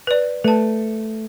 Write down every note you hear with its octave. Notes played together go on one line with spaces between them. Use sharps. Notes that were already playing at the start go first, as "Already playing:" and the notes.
B4 D5
A3 B4 A5